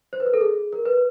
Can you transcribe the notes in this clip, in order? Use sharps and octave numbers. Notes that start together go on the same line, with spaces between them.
C5
B4
A#4
A4
G#4
A#4
B4